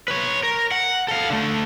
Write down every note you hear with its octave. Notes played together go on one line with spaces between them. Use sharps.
B4 C#5
A#4
F#5
A4 F5
D3 A3